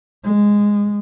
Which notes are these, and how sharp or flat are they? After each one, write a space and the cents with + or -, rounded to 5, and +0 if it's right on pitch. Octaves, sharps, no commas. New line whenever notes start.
G#3 -10